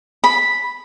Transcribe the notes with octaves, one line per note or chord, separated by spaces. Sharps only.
B5